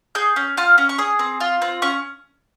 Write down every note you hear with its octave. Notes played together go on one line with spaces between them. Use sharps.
G#4 G6
C#4
F4 F6
C#4
C#6
G#4 D#6
C4
F4
C4
C#4 C#6